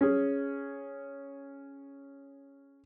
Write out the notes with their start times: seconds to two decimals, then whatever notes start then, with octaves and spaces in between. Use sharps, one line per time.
0.01 C#4 G#4